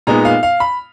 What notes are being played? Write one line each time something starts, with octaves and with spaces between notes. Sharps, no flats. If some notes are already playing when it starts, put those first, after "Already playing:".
A#2 G#3 B3 D#4 A#5
F5
F5
B5